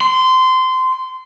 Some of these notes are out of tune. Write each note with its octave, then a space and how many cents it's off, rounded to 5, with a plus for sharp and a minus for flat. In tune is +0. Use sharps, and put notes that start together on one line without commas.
C6 -20